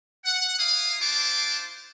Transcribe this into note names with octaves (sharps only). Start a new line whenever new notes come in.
F#5
E4 F5 D#6
D4 E4 F4 C5 A5 D6